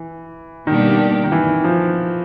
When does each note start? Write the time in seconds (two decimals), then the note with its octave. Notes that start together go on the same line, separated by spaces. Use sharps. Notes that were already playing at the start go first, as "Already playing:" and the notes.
Already playing: E3
0.67 B2 D#3 G3 A#3 D4 G4
1.24 D#3
1.32 E3
1.64 F3